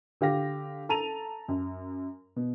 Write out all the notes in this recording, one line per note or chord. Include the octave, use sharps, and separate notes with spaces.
D3 G4 F5 A#6
A4 A5 A#5 D#7 F7
F#2
B2